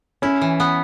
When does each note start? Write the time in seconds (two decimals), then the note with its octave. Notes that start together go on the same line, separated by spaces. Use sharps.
0.22 C#4 E4
0.41 E3
0.60 B3